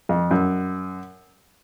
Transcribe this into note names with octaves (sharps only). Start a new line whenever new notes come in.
F2
F#2